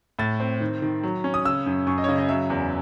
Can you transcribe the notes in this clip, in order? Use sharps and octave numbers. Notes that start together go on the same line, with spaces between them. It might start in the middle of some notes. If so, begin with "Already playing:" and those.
A2 A6
C4
D#3
D#3
F#3
C#4
D#6
C#3 E6
F#2
F#2 C#6
D#5
C#5
C#3 D#5
D#5
F#3 E5
E2